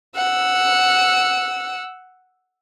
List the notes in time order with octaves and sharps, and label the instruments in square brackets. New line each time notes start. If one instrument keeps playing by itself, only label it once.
[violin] F#5 E6